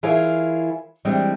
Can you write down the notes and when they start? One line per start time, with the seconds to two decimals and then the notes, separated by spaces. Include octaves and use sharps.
0.03 E3 E4 F4 G#4 A#4 C#5
1.05 E3 G3 G#3 C4 D4